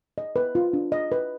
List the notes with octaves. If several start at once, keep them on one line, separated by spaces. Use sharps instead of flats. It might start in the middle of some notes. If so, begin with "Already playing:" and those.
D#5
B4
F4
D4
D#5
B4